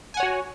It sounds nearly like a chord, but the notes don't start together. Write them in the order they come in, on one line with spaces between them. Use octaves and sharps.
G#5 F#5 C#5 F#4